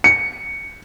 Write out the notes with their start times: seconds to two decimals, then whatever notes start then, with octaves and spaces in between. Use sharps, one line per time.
0.04 C#7